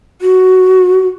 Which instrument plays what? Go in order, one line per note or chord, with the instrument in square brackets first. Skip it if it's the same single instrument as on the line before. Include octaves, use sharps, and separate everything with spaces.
[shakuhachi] F#4